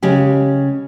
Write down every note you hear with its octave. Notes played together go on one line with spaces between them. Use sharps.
C#3 G#3 C#4 G4